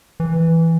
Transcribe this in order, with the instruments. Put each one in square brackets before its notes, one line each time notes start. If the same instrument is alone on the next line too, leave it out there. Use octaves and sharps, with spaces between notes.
[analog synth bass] E3